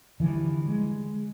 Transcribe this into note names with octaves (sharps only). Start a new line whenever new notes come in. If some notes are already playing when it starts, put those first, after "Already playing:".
D3 E3 F3 G3
G#3